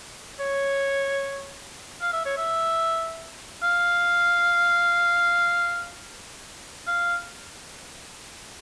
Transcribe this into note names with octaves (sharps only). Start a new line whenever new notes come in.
C#5
F5
E5
C#5
E5
F5
F5